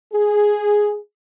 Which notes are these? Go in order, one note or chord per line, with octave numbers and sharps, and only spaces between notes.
G#4